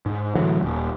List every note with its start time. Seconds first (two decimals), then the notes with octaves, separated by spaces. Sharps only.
0.06 G#2
0.35 A2 D3 E3 F#3
0.62 D#1